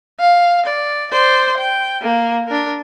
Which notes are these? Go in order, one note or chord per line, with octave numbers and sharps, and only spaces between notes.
F5
D5
C5 D5
G5
A#3
D4 A#4